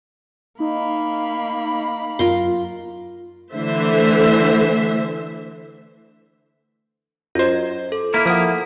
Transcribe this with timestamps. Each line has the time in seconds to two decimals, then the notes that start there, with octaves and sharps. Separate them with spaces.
0.60 A#3 D#4 B5
2.19 F#2 F4 A#4 C6
3.54 D3 E3 A3 C5 E5
7.35 F#2 F4 C5 D#5
7.92 A4
8.14 A#3 E4 A#4
8.26 F3 A4 F#5 D#6